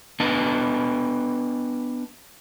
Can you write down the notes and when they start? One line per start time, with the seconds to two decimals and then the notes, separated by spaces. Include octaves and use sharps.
0.20 B3 D4 B4 D#5 A5